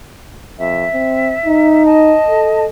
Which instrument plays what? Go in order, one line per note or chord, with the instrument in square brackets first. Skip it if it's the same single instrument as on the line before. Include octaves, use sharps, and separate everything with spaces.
[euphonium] F2 [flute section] E5
[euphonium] C4
D#4
[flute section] D#5 A5
[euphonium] A4